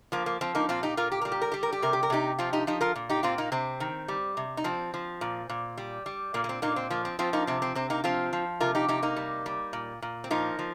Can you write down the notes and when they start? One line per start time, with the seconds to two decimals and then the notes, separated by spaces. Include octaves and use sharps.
0.12 F3 A#3
0.26 A#3
0.41 F3 C4
0.55 A#3 D#4
0.69 A#2 C4 F4
0.83 D#4 G4
0.97 A#2 F4 A#4
1.12 G4
1.21 G3 A#4
1.32 G4
1.42 A#4
1.52 G3 G4
1.63 A#4
1.73 G4
1.82 C3 A#4
1.93 G4
2.03 A#4
2.10 C3 D#4 G4
2.39 F3 C4 F4
2.53 D#4 G4
2.67 F3 D#4 G4
2.81 F4 A#4
2.96 A#2
3.09 D#4 G4
3.23 A#2 C4 F4
3.38 A#3 D#4
3.52 C3 C4
3.80 D#3
4.08 G3
4.37 C3
4.57 D#4
4.64 F3 C4
4.94 F3
5.21 A#2
5.50 A#2
5.77 G3
6.06 G3
6.34 A#2 A#3
6.44 A#3
6.49 C4
6.62 A#2 A#3 D#4
6.76 C4
6.90 F3 A#3
7.05 C4
7.19 F3 C4 F4
7.33 A#3 D#4
7.47 C3 C4
7.62 C4
7.75 C3 C4
7.90 A#3 D#4
8.04 F3 C4 F4
8.33 F3
8.60 C3 F4 A#4
8.75 D#4 G4
8.88 C3 D#4 G4
9.03 A#3 D#4
9.16 G3
9.46 G3
9.73 A#2
10.02 A#2
10.24 C4
10.31 F3 A#3 D#4
10.59 F3